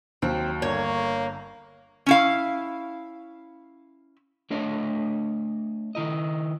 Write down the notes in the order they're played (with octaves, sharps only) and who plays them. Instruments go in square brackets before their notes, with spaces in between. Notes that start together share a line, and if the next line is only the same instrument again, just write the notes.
[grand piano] D#2 F#3 [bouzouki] C4
[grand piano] G1 D3 [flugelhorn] A#3 [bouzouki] C#5
[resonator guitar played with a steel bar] C#4 E4 F5
[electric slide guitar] A3 D4 C#5 D#5
D#3 E4 D#5